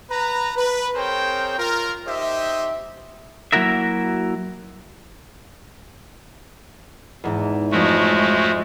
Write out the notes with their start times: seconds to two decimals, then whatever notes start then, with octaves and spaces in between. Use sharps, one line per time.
0.10 B4 A#5
0.57 B4
0.95 C4 G#4 A#4 C5 C#5 G5
1.58 F4 A#4
2.07 D#4 G4 C5 D#5 E5
3.52 F#3 A#3 E4 F#4 A#4 E5
7.24 E2 G#2
7.71 F2 F3 G#3 A3 C#4 F#4